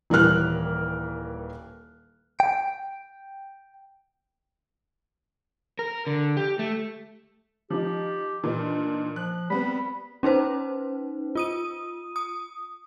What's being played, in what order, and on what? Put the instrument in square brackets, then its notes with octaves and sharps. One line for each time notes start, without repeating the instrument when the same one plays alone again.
[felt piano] D#1 E3 G3 A#4 F6 F#6
[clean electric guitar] G5
[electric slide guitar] A#4
D3
G4
A3
[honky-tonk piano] F3 D#4 [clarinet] G4
[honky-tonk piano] A#2 E3 D#4
[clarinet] D4
[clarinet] F3 [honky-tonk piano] F#6
[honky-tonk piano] G3 B3 C4 [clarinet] B5
[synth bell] C#4 D#4 B4 C5
F4 D#6 D#7
D#6